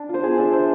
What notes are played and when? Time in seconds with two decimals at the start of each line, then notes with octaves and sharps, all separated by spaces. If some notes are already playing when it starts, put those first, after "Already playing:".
Already playing: D4
0.09 F4 C5
0.24 B3 G#4
0.38 D4 E5
0.53 D4 C5